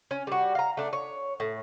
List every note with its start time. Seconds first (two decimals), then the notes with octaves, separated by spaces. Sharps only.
0.11 C#4
0.27 G3 F#4
0.55 F5 A#5
0.77 A3 D4
0.93 C#5
1.40 A2